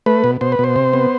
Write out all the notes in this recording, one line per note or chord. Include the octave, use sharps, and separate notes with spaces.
A3 B4
B2
B2 C5
B4
B2 C5
C3
B3